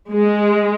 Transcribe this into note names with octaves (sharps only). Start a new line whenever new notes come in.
G#3